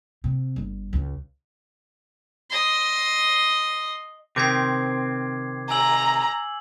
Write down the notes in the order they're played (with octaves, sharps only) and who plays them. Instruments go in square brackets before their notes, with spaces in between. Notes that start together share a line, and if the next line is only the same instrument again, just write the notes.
[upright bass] C3
G1
C#2
[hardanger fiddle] D#5 C6
[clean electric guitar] C3 D#3 C4 [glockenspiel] D6 G#6 C7
[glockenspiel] G#5 E6 F#7 [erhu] A#5